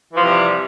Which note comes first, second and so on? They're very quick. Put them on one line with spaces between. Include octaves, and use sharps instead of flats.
E3 F3 C3 G3